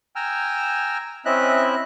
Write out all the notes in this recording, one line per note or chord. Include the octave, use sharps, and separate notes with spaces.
G5 G#5 A#5 E6 F6
C4 C#4 E4 D#5 E5 F#6